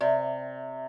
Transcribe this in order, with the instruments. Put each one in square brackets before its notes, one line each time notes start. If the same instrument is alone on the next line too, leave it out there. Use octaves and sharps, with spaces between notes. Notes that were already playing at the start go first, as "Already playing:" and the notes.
[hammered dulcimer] C3 [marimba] D5